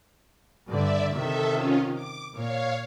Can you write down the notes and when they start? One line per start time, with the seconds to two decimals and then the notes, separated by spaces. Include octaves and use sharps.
0.67 G2 D3 D5 E5
1.12 C3 D#3 A4 E5
1.51 C#4 F4
1.93 D6
2.33 A#2 C#5 F5